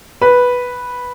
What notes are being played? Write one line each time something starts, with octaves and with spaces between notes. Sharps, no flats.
B4